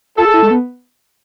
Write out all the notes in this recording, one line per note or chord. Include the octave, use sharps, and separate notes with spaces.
F4 A4
G#4
E4
G#3
B3